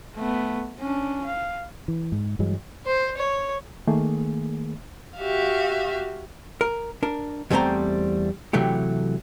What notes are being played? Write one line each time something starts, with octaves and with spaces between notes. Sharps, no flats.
A3 B3
C#4 D4
F5
E3
G#2
G2 E3 F#3 G#3
C5
C#5
D#3 A3 A#3 G#4
F#4 G4 E5 F5
A#4
D4 A#4
E2 G3 A3 C4 C5 A#5
C3 E3 F#3 A3 G4